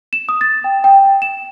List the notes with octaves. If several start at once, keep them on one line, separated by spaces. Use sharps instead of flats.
E7
D#6
A6
G5
G5
E7